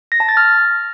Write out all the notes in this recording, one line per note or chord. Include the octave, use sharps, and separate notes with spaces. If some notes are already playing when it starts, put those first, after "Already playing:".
A#6
A5
A6
F6